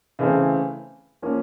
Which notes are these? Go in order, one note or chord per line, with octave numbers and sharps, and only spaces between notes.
C#3 E3 A3 C4
F3 A#3 C#4